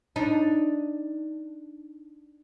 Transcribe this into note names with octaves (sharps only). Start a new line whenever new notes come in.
D4 D#4